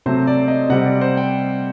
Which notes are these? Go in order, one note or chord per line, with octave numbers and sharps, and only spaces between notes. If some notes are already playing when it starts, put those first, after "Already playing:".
C3 F#3 A3 C4 C5
D5
D#5
C3 G3 C4 F#5
D5
C5
G5